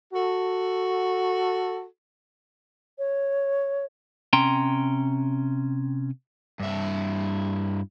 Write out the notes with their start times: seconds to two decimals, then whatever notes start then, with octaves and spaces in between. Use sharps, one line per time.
0.13 F#4 A4
2.98 C#5
4.33 C3 C#4 G5 A#5 C6
6.60 G2 E4